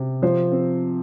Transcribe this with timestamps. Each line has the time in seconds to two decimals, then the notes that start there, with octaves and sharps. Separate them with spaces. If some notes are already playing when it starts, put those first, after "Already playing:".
Already playing: C3
0.22 F3 C5
0.52 C4